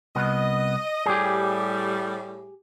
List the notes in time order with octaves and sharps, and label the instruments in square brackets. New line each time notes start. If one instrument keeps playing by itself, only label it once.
[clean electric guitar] C2 B3 [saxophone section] D#5
[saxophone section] A2 G3 [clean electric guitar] G4 G#4